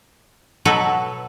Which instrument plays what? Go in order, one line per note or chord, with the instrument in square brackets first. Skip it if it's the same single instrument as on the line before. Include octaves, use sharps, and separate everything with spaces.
[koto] B2 F#3 A4 B4